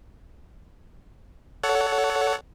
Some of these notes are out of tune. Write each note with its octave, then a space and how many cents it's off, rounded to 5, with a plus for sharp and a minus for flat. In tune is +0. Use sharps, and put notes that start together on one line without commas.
A4 +0 C#5 +25 F#5 +0